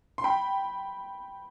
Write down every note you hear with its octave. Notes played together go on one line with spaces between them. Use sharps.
C6
G5 B5